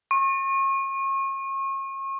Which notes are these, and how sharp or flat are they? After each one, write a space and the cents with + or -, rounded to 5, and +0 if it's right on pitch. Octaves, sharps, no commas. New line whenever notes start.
C#6 -35